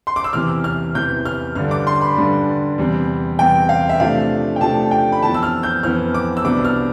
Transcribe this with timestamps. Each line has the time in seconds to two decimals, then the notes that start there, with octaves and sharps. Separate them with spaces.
0.07 C6
0.16 D6
0.24 E6
0.33 E2 C3 E3 F6
0.64 F6
0.94 E2 C3 E3 G6
1.26 F6
1.55 G2 D3 G3 D4 F6
1.71 D6
1.87 C6
2.01 B5
2.17 G2 D3 G3 D4
2.78 E2 C3 G3 C4
3.39 E2 C3 G3 C4 G5
3.69 F5
3.89 E5
4.00 C3 F3 A3 D4 F5
4.56 G5
4.61 C3 F3 A3 D4 A5
4.91 G5
5.12 B5
5.22 F2 E3 B3 A5
5.34 E6
5.43 F6
5.63 G6
5.83 F2 E3 B3 F6
6.14 D6
6.37 E6
6.44 C2 B2 B3 D4 D6
6.65 F6